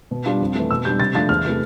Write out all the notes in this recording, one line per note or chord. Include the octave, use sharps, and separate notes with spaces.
B2
G3 D4 F4
F2
E3 A3
B2 E6
G3 D4 G6
C3 A6
F3 A3 D4 A6
E2 F6
C3 E3 A3